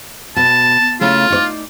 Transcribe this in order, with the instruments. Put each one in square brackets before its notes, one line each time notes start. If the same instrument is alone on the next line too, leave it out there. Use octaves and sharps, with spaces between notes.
[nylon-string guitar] B2 [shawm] A5
[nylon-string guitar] C#3 A3 E4 [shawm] F4
[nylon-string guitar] D#4 C#5 D5